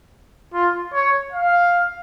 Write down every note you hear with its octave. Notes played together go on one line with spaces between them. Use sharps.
F4
C#5
F5